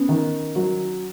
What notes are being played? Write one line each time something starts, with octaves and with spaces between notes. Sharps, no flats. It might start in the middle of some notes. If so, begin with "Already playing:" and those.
Already playing: B3 C#4
D#3
F#3